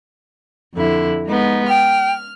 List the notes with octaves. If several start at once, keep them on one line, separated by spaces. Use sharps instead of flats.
F2 D3 E4
G#3 B3 D#4
G5 F6